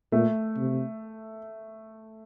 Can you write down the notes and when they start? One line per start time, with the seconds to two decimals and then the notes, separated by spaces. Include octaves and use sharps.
0.12 A#2 A3
0.57 C3